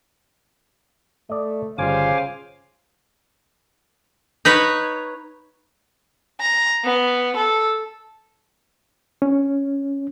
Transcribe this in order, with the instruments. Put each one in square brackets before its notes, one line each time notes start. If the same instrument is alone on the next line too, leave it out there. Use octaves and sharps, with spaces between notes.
[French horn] A3 [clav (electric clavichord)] D5 D#5
[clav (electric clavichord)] G1 G3 [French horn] C#3 [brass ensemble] F4 C5 F5 [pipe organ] G#5 D6
[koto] D#4 B4 C#5
[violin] A#5
B3
A4
[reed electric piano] C#4